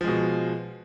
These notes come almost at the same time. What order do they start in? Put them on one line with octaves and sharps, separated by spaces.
F3 G#3 B2